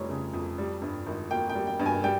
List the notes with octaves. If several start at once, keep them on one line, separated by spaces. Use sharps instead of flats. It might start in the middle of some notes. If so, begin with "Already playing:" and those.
Already playing: F1 F2 G3 C#5
C#3
F2
G3
G2
G#1
A#3 G5
G5
G3
G5
G2
G#5
G3 G5